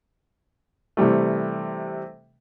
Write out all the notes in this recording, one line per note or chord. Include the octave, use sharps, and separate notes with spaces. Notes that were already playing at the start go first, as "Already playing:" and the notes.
C3 E3 G3 A3